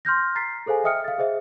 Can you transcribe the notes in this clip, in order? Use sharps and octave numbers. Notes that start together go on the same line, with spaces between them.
C6 F6 G6 A#6
A#5 A6 B6 C7
G#4 A4 C5 F5 G#5
D#5 E5 G5 D#6 F6 C#7
F5 A6
G#4 C5 D#5 E5